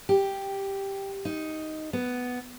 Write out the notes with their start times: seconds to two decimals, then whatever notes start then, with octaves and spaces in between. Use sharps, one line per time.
0.09 G4
1.25 D#4
1.93 B3